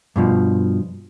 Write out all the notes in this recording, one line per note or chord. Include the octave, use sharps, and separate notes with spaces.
G2 B2 F3